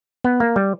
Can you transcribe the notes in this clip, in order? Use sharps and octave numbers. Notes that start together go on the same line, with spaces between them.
B3
A#3
G3